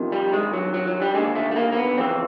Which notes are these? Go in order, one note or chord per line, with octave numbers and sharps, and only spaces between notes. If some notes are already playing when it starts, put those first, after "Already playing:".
Already playing: F2 C3 D#3
G3
G2 D#3 G#3
F#3
F#3
F#3
G3
D#2 D3 G#3
A3
A3
A#3
A#3
B3
F2 C#3 E3 C4